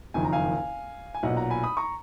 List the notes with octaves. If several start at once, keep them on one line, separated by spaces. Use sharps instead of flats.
F#1 F2 D#3 G#5
A#5
F5 G#5
G#5
B1 A#2 D#5 F#5
F#5 A#5
G#5 B5
B5 D#6
A#5 C#6